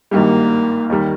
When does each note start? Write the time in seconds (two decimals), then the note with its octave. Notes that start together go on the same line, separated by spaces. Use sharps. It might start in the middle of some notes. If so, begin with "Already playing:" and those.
0.11 G#1 G2 D#3 G3 A#3
0.90 D#2 D#3 G3